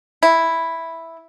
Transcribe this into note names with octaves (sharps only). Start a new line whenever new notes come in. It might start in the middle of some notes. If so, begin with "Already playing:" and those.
E4